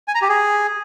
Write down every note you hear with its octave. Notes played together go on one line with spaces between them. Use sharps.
G#5
A#5
G4
G#4